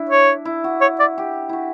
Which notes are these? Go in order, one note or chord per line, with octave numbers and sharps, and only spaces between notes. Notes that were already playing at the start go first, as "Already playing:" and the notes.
Already playing: D4 E4
C#5
E4
F#4
C#5
D5
G4
E4 F#4